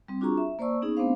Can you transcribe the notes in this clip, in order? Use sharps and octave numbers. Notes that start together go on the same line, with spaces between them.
G3 C4
D4 F4 F#4 G#4 A#5 C#6
E5
A#3 C5 D5 A5 C#6 E6
B3 C#4 D#4 G#4
A3 B3 C4 D4 C5 F5